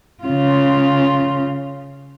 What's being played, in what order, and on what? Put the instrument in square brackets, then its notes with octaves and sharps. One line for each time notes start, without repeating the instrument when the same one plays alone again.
[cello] C#3 F4